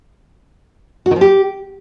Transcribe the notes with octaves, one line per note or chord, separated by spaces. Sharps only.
F#4
D#3
F3
G4